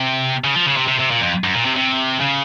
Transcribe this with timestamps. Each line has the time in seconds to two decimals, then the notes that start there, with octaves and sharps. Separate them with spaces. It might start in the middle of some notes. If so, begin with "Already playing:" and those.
Already playing: C3
0.44 C#3
0.55 F3
0.66 C#3
0.77 C3
0.88 C3
1.00 C3
1.11 A#2
1.21 F2
1.44 F#2
1.54 A#2
1.65 C3
1.76 C3
2.20 C#3